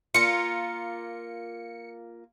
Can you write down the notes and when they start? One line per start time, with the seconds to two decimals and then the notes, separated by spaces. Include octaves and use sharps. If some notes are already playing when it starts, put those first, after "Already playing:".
0.14 A#3 F4 C#7